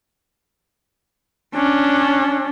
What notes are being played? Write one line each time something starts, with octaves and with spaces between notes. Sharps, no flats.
C#4 D4